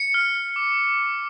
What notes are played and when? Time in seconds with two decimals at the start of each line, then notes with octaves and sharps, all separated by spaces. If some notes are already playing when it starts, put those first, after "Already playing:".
Already playing: C#7
0.14 F6
0.35 F6
0.56 D6